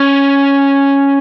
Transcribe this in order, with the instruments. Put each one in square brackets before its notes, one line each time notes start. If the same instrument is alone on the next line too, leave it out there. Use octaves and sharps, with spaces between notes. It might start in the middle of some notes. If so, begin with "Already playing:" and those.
Already playing: [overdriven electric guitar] C#4